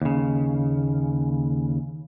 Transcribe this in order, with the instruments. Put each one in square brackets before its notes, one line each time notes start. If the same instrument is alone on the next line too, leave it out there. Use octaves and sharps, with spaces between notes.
[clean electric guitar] D#2 C#3